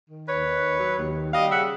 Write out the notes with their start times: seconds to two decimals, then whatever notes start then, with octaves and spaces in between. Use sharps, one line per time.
0.10 D#3
0.27 D#2 B4 C#5
0.46 D#3
0.62 D#2
0.80 F#3
0.98 D#2
1.15 D#3
1.33 G3 D#5 F5
1.50 C#3 E5 F#5